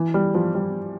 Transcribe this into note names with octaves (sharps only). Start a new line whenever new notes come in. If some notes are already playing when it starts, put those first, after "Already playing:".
Already playing: E3
G3
F3
G3